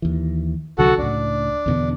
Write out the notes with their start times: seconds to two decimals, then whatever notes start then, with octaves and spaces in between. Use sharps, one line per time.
0.02 D#2 E3
0.78 C2 D3 F#3 F#4 A4 F#5
0.98 C#2 A2 D4
1.66 E2 B2 D3